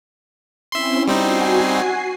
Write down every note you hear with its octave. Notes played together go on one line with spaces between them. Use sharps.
C4 C#4 E4 E5 C6
G3 C4 D#4 F#4 G#5 C7